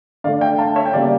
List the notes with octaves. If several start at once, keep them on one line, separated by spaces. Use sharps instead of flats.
D3 A3 D5 F5
E5 G5
F5 A5
C#5 E5
G5
C#3 G3 A#3 D5 F5